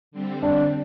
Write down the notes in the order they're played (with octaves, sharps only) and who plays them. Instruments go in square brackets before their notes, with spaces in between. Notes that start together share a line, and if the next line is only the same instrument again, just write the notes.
[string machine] D3 G3 C4
[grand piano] D4